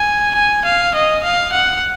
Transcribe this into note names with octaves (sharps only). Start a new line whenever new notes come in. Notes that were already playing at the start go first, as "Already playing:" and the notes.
Already playing: G#5
G#5
F5
D#5
F5
F#5